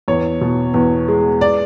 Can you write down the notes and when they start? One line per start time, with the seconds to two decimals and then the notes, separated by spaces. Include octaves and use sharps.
0.08 E2 C#5
0.41 B2
0.74 E2
1.08 G#3
1.41 D5